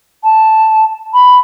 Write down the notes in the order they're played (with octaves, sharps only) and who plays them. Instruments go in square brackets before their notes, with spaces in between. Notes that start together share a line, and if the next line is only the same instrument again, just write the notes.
[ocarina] A5
B5